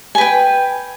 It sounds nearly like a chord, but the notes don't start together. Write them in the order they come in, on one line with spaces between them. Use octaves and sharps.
G#5 B4 G5